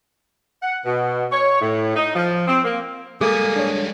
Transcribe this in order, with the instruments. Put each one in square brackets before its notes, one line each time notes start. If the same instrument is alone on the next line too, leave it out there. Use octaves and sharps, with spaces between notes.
[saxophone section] F#5
B2
C#5
A2
D#4
F3
C4
A#3
[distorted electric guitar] G3 G#3 [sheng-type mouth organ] A#3 G#5 D#6 [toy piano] G#4 A4
[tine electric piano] D4 C#5